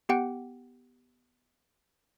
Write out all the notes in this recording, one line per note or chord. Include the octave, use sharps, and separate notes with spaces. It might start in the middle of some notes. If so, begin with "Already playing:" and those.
B3 G4 F#5 G5